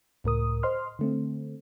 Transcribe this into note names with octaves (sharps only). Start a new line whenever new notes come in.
C#2 A2 A#4 D#6
C5 D#5 C6 F6
D3 A3 C4